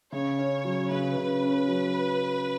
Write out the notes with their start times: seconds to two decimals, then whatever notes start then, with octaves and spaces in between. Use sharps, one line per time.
0.12 C#3 C#5
0.39 C#4
0.65 F#3
0.90 C#3 B4
1.17 C#3
1.43 C#4
1.68 F#3